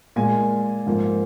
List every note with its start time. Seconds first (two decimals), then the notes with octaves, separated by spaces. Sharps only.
0.16 A#2 G#3 G#5
0.86 G#2 F3 A#3